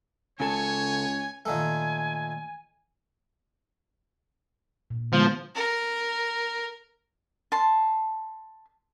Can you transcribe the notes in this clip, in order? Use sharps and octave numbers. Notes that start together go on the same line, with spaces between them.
C#2 C#3 A4 C#5 G#5 A5
A#2 D#3 A3 G#5
A#2
D3 F3 G#3 B3
A#4
A5 C6